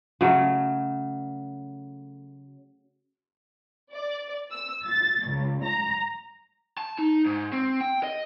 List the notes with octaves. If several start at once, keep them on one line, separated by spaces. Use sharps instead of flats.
C#3 F#3 A3
D5
E6
A6
C#2
A#5
A5
D#4
G#2
C4
G5
D#5